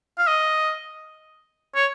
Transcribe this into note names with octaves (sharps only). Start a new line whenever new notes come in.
F5
D#5
C#5